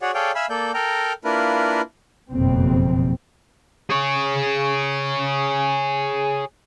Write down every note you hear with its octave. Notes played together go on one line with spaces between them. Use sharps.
F#4 G#4 C#5 D5 F#5
G#4 A4 C#5 D5 F5 G5
E5 F5 G#5 B5 E6
A#3 A4 D5 G6
A4 A#4 G5 A#5
A#3 D4 E4 F4 A#4 B4
F#1 F2 B2 C4
G#4 C#5